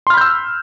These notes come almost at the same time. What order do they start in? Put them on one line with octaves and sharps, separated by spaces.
C6 F6 B5 G6 E6